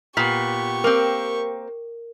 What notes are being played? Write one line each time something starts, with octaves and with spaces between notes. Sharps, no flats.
A#2 B3 G4 C#6 B6
A#3 C4 A#4